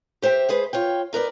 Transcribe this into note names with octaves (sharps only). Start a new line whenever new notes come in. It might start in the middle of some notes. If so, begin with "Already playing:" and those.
G4 C5 E5 F#5 G5
G#3 G#4 B4 C5
F4 C#5 G5
D#4 A#4 B4 D5